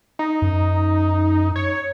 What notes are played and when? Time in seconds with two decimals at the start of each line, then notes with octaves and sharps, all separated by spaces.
0.19 D#4
0.42 F#2
1.56 C#5